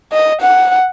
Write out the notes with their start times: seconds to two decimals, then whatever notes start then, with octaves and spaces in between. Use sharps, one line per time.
0.12 D#5
0.42 F#5